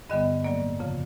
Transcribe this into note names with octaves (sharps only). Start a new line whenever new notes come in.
G2 D3 G3 B3 D#5
A2 F#3 A#3 D5
F2 C#3 F3